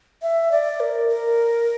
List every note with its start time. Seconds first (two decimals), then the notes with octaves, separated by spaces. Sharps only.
0.22 E5
0.52 D5
0.80 A#4
1.08 A#4